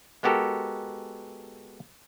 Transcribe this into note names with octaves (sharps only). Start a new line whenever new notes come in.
G#3 B3 F#4 G4 A4 A#4